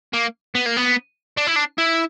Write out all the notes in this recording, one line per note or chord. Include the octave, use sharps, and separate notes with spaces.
A#3
B3
A#3
B3
D4
E4
D4
E4